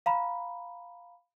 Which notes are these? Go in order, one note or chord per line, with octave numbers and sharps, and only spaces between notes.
F5 A#5 B5